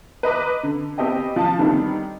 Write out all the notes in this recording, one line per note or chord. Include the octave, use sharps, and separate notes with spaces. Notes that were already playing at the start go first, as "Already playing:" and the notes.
B4 D#5 A#5 D6
D3
B3 C4 G4 D#5 G5
F3 A5
D3 D#3 G3 B3 C4 D#4